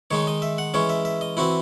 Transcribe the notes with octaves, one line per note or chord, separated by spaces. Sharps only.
D#3 G#3 D#4 C#5
D#5
E5
F#5
E3 G#3 C#4 C#5
E5
E5
D#5
E3 C4 E4 F#4